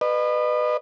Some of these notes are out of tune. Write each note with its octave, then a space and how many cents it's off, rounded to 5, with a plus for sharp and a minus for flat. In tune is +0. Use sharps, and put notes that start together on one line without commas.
B4 +5 D#5 -40